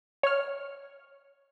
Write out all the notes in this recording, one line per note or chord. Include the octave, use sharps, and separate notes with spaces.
C#5 F6